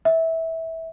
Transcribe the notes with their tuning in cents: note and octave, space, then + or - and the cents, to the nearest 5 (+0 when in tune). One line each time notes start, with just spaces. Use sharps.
E5 -20